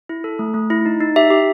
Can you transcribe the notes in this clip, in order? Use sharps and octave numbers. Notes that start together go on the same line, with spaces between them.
E4
A4
A3
A3
E4
D#4
D#4
G4 E5
G4